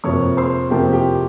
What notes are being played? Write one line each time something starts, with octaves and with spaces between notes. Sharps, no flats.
F2 C3 F3 A#3 C#5 C#6
C5 C6
F2 C3 F3 A#3 G4 G5
G4 G5